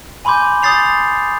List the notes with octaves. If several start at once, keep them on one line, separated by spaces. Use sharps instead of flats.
G#5 B5 C6 D6 G6
C6 D#6 G6 A6 C7 F7